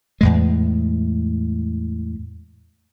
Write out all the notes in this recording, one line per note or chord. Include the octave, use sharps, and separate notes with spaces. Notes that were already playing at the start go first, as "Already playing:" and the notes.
E2 A2 G#3